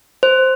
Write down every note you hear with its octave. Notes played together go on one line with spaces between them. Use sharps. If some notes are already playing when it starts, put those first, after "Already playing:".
C5